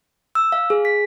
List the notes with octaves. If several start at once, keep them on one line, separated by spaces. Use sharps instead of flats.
E6
F5
G#4
B6